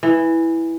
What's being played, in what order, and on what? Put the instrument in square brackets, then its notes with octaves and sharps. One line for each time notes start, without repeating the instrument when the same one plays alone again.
[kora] E3